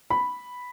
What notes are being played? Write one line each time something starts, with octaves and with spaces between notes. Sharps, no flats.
B5